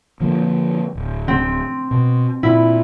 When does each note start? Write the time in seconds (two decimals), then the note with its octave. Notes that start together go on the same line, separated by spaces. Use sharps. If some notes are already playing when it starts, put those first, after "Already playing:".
0.20 D3 F3 A#3
0.95 D1
1.28 C4
1.91 B2
2.43 A#2 E4